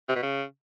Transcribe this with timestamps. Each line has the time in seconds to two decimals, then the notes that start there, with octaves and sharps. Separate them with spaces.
0.08 C3
0.15 B2
0.22 C#3